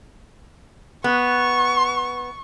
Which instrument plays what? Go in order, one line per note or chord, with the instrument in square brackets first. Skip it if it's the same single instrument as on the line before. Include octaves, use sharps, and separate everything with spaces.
[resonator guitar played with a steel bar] B3 [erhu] C#6